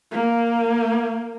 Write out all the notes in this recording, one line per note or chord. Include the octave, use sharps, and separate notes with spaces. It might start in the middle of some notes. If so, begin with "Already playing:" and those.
A#3